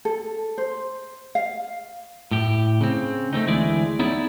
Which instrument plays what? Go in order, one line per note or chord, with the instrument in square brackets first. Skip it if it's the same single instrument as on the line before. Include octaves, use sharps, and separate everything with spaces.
[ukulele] A4
C5
F5
[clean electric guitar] A2 G4
C#3 C4
A3 A#3 C4 D#4
D2 E3 G#3 E4 G#4 D5
B3 D#4 E4 G#4 C#5 D5